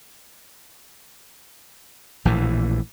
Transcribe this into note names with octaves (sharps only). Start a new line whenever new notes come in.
A#1 A2 E3